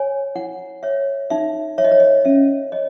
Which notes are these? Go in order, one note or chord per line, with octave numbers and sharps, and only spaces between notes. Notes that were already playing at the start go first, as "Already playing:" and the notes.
Already playing: C#5 G#5
E4 F#5
C#5 E5
D#4 E5
C#5 E5
D#5
C#5
D#5
C#4 E5
C#5 D#5